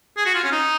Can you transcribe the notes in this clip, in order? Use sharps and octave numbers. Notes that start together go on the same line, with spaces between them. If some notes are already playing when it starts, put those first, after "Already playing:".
G#4
F#4
F4
C#4
D#4